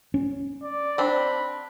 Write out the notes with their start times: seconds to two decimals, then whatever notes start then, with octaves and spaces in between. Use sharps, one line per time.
0.14 C#4
0.63 D5
0.98 C4 D4 B5